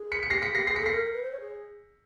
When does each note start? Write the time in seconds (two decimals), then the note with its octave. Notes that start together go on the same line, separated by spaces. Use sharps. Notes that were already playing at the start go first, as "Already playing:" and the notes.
Already playing: G#4
0.12 B6 C#7
0.23 C#7
0.30 G4 A#6 C7
0.42 G#4 B6 C#7
0.55 G4 A#6 C7
0.67 G#4 A#6 C7
0.76 B6 C#7
0.80 A4
0.86 A#6 C7
0.92 A#4
1.04 A#4
1.13 B4
1.22 C5
1.32 C#5
1.41 G#4